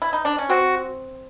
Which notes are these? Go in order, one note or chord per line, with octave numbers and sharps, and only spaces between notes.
E4
D#4
D4
C#4
C4 F#4